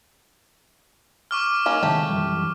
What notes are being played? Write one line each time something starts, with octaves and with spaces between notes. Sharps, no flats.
C#6 D6 F6
A#3 C#4 D#4
C3 D#3 G#3 A3 E4 G4
F#2 E3 G3